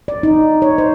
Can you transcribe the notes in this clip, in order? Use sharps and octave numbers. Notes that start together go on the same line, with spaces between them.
D5
D#4
C#5
C5